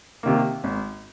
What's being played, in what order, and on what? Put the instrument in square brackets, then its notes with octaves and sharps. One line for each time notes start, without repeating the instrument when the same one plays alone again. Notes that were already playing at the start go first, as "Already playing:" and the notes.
[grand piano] C3 D#3 A#3
G#1